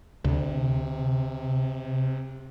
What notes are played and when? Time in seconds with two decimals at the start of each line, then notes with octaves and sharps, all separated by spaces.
0.24 D2 C3